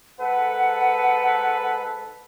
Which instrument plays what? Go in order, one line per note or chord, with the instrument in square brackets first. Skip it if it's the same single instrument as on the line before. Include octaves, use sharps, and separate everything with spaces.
[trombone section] G#2 A4 B4 [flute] F#5